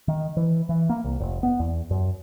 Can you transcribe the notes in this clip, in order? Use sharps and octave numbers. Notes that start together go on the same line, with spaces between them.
D#3
E3
E3
A#3
C2
F1
B3
E2
F#2